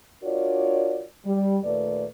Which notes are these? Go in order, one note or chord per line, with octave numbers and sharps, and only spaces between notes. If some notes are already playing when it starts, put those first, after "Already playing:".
D4 F4 F#4 A#4 C#5 D5
G3
D#2 A#2 A3 B4 D5